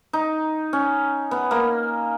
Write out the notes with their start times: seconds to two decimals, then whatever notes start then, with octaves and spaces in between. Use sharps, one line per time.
0.13 D#4
0.73 C#4
1.31 B3
1.51 A#3